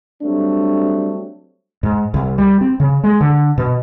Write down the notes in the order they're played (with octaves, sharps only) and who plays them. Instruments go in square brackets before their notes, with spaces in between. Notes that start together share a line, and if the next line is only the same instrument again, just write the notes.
[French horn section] F#3 G3 A3 C4 D4
[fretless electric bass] G#2
C2
G3
C4
C#3
G#3
D3
B2